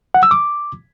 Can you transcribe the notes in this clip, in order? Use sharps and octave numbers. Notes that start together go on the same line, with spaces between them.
F#5
E6
D6